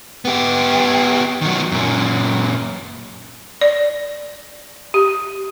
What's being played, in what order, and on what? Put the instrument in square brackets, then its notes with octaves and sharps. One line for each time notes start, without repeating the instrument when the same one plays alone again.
[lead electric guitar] B3 G4
D#3 F#3
F#2 A#2
[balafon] D5
G4